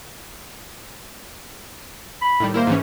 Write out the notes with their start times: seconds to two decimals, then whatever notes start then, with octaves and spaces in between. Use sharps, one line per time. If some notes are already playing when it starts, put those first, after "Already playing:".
2.22 B5
2.40 A2 D#3 G3
2.54 A#3 E4 A#4 C5
2.67 G#2 E3 C#4